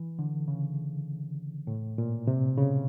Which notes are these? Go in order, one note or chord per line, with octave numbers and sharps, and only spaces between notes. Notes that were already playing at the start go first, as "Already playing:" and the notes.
Already playing: E3
D3
C#3
A2
A#2
C3
C#3